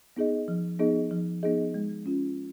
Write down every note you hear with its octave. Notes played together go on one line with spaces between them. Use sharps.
B3 D#4 G#4 D#5
F3
B3 D#4 G#4 D#5
F3
B3 D#4 G#4 D#5
G#3
C#4 F4